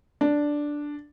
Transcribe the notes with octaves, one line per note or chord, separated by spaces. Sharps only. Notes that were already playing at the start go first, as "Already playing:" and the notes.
D4